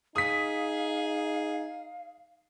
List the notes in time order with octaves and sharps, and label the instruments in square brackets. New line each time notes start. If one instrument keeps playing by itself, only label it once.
[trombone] D#4 [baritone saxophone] G#4 [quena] F5 [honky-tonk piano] D#6 B6